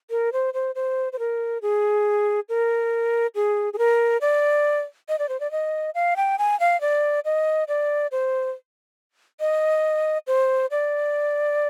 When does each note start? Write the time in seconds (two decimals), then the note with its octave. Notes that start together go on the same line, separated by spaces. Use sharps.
0.10 A#4
0.33 C5
0.54 C5
0.75 C5
1.13 C5
1.19 A#4
1.62 G#4
2.49 A#4
3.35 G#4
3.73 G#4
3.78 A#4
4.21 D5
5.09 D#5
5.19 D5
5.29 C5
5.40 D5
5.51 D#5
5.95 F5
6.17 G5
6.39 G#5
6.60 F5
6.81 D5
7.25 D#5
7.68 D5
8.12 C5
9.40 D#5
10.27 C5
10.71 D5